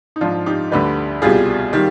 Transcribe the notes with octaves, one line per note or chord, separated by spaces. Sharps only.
D#4
G#2 F3 D4 F4
D#4 G4
D2 D3 G3 B4 D5
C2 B2 G3 F4 G#4
D#3 G3